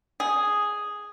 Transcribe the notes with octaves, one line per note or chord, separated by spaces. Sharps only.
G#4